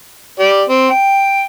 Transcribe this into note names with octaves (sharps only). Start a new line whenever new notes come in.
G4 D5
C4
G5